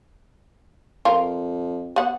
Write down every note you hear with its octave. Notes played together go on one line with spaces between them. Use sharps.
F2 F4 A#4
B3 F#5